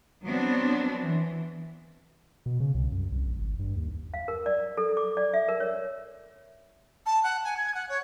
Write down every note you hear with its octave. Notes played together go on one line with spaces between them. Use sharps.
F#3 B3 C4 D4
E3
B2
C#3
C2
F#2
C2
A#1
G#1
G2
D#2
F5
A#4
D5
A4
D6
D5
E5
A#4
C#5
A5
F#5
G#5
G#6
F#5
C#5